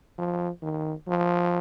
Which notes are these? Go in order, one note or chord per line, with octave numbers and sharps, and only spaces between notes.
F3
D#3
F3